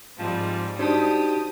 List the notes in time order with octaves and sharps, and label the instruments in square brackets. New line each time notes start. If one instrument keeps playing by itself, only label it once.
[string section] G#2 G3 C4 [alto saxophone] F3
[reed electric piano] D4 C5 [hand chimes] D#4 F#4 A5 [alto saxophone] G4 [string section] D#6